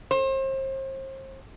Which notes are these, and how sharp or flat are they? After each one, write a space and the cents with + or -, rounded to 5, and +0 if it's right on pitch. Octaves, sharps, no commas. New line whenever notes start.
C5 +35